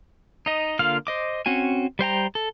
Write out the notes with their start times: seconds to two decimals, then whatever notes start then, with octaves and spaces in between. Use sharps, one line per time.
0.46 D#4 D#5
0.79 D3 A#3 F4 F5 F6
1.07 C5 D#5 D6
1.46 C4 C#4 F#4 G#5
1.99 G3 C5 G5 A#5
2.35 A4